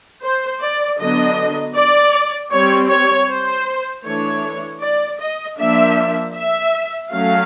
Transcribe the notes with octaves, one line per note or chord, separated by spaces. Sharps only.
C5
D5
D3 F#3 B3 D4 D#5
D5
G3 C4 C#5
C#5
C5
E3 A3 D4 C#5
D5
D#5
F3 A#3 D4 E5
E5
F#3 A3 C#4 F5